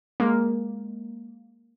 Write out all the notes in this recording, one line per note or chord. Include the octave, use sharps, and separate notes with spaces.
G#3 A#3